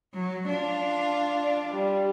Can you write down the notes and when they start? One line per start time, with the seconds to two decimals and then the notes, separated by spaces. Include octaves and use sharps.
0.14 F#3
0.49 D4 F4
1.42 D5
1.74 G3